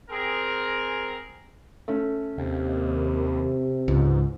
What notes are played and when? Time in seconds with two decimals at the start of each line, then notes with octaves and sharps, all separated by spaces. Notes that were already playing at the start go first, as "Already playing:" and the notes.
0.10 C4 G#4 A#4
1.88 A3 C#4
2.38 D#2 C3
3.88 C#2 G#2